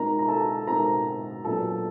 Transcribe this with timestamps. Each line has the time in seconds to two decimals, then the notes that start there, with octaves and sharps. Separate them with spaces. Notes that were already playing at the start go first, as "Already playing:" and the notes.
Already playing: B2 G#3 C4 D#4 A#4 A#5
0.19 A#5
0.28 A4 A5
0.67 B2 G#3 C4 D#4 A#4 A#5
1.45 A#2 F#3 B3 D4 A4 A5